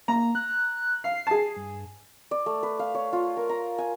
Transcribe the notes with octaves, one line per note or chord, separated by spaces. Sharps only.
A#3 A#5
F#6
F5 C7
G#4 A5
G2
D5
A3
B4
F5
C#5
F4
A#4
A#5
G#5